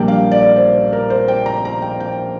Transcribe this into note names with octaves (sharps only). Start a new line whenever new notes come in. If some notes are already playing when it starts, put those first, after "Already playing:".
Already playing: A#1 A#2 G3 A#3 G5
F5
D5
C5
A#4
C5
G5
A#5
A#5
G5
G5